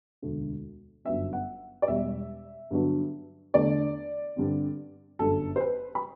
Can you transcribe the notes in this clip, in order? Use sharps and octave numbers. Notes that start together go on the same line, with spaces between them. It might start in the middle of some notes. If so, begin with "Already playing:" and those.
E1 D2 D3 A3
G1 F#2 F#3 B3 D4 E5
F#5
D5
E1 E2 B2 G3 E5
G2 D3 F#3 B3 D4
E2 D3 A3 D4 D5
G2 D3 G3 C4
G1 F#2 D3 G3 D4 A4
C5
B4
B5